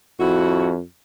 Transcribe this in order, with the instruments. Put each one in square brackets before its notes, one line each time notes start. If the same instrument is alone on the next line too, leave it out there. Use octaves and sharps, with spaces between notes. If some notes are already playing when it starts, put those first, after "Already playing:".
[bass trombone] F2 [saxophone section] E4 F#4